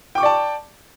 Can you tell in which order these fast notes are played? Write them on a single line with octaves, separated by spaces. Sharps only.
G5 D6 C#6 D5 A5